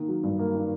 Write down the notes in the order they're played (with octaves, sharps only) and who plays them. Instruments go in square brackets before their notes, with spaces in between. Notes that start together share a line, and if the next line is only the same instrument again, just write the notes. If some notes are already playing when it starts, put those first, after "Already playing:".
Already playing: [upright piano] D#3 A#3
F#3
G2
A#3
D#3